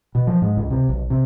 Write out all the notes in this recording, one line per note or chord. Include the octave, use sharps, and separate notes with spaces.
B2
F3
G#2
C#2
C3
B1
C3